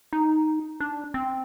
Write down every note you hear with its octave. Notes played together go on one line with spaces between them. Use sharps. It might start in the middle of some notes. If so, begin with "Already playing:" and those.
D#4
D4
C4